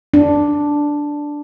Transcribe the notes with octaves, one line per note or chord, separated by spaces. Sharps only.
D4